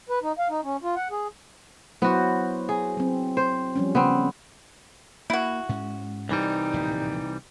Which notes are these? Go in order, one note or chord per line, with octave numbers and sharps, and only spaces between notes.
B4
D#4
F5
D#4
C#4
F4
F#5
G#4
F#3 B3 E4 F#4 C5
G#4
F#3 C4
C5
F3 G3 C#4
C#3 B3 C4
A#3 E4 F#4
G#2 G#3 C#4
C2 E3 G3 D#4
D1 A#1 A2